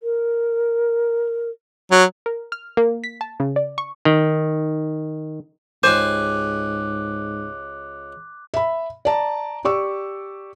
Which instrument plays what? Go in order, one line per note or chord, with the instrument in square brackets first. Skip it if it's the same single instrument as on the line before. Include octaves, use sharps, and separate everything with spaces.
[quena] A#4
[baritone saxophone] F#3
[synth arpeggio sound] A#4
F6
A#3
B6
A5
C#3
D5
C#6
[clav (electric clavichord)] D#3
[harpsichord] C#2 G4 G#5 [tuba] G#2 [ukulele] C5 [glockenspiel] D6 F#6
[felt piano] E5 B5
D5 A5 A#5
G4 D5 C#6 E6